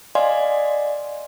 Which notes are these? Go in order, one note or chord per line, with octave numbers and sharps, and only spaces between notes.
D5 D#5 F5 G#5 C6